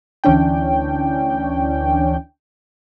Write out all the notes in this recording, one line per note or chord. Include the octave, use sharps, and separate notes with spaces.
D2 E3 C#4 D4 G5